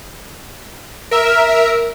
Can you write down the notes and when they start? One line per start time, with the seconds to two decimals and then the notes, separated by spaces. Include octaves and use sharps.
1.11 A#4 E5